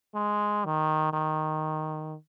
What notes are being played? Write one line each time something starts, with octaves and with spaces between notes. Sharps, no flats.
G#3
D#3
D#3